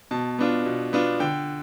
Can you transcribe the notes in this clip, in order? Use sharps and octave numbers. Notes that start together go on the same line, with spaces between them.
B2 A5
B3 D4 F4
B2
B3 D4 F4
D3 G5